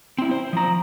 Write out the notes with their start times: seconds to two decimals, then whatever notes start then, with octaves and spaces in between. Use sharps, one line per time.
0.18 C4 E4
0.31 C5
0.53 F3 A#5